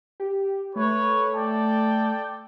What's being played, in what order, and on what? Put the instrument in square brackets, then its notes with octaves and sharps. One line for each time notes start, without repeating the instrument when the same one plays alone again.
[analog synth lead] G4
[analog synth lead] A3 [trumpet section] B4 C#5
[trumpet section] A4 D5 G5